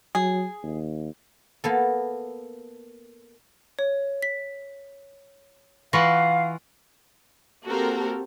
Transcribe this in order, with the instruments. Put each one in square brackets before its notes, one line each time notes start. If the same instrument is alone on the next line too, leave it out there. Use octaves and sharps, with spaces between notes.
[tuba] F#3 [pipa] G#4
[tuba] D#2
[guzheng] A#3 B3 A4
[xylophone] C#5
B6
[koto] E3 F4 F#5 [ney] F5 [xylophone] B5 C#6 A#6
[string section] A#3 C4 F#4 G4 A4 A#4